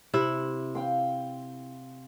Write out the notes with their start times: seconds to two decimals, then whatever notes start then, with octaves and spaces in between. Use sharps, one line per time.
0.13 C3 E4
0.75 F5 G5 C6